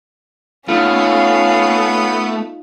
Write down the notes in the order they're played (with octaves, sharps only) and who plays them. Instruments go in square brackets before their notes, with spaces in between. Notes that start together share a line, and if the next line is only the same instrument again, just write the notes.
[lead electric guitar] A3 [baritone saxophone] B3 [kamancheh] C#4 F5 [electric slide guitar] D#4 F4